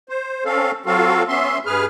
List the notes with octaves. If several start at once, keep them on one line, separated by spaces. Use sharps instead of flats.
C5
C4 C#4 A4 F5
F#3 C4 F4 F#4 A4 F5
B3 C#4 E5 C6
G2 G#4 B4 F6